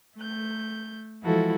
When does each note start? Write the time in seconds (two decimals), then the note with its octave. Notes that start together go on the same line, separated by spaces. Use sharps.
0.18 A3 G6
1.22 E3 F3 G#3 E4 F#4 A4